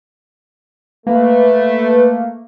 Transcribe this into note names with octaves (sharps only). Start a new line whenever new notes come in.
A3 A#3 B4